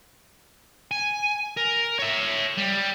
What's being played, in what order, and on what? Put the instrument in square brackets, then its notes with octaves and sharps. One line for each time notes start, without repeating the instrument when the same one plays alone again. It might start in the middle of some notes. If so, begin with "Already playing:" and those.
[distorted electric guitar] G#5
A#4
C#5 E5
G3